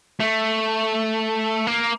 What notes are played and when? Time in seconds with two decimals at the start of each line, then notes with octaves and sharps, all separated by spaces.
0.20 A3
1.67 A#3